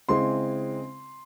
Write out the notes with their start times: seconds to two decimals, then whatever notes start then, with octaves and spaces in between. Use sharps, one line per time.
0.09 C#3 G#3 C4 E4 C6